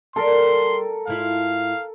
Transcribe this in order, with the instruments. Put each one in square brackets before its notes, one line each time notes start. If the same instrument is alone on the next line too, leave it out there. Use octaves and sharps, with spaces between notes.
[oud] G3 [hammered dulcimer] A4 A#4 [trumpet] C6
[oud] G#2 E4 F4 [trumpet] F5